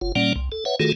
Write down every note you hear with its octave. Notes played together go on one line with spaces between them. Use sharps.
F#1 F4
A#2 G3 A#3 C#4 D5 F#5
C2
A4
B4 C#5 E5 F#5
D#3 A3 F4 F#4 G#4 A4